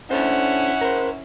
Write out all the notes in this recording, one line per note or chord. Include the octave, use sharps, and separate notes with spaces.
C#4 D4 E4 A4 C5 F#5
A#4 C5